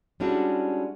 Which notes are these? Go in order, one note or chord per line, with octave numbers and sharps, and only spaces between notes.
G3 G#3 C#4 D4 E4 F#4